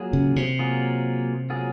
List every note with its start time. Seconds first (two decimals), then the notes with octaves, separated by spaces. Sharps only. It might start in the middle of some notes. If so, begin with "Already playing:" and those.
Already playing: F#3 A#3 F4 G#4
0.13 C#3
0.36 C3
0.59 F#3 A#3 F4 G#4
1.50 F#3 A#3 F4 G#4